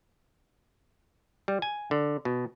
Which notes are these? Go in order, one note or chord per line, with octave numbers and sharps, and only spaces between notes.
G3
G#5
D3
B2